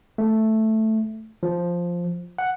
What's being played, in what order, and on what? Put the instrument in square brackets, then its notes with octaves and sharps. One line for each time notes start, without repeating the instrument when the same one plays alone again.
[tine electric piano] A3
F3
F#5